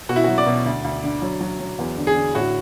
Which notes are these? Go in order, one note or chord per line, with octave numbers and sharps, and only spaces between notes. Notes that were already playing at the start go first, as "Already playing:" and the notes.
B2 F#4
E4
F#3 F#4
D5
B2
D2
D2
D3
F#3
F#3
F#3
E2
D3
G#4
D3
A2 F#4